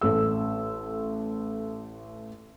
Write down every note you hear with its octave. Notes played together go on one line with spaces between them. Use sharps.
A1 A3 E6